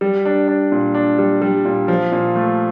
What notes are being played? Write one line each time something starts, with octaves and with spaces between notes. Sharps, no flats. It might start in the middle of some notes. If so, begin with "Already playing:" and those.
G3
D4
D4
A#2
D4
G3
G3
A#2
F3
A#2
A3